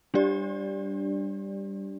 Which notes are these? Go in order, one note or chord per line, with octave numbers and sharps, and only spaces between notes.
G3 D4 G4 D5